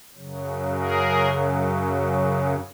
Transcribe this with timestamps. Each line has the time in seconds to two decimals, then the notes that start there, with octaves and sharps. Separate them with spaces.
0.14 F#2 C#3 F#3
0.74 G#4 A#4